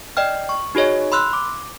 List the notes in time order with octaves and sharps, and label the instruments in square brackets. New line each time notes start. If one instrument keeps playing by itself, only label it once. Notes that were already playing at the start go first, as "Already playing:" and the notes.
[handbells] D5 D#5 G5 F6
C#6
D#4 F#4 G#4 C#5 D#5
B5 C6 E6 F#6
D6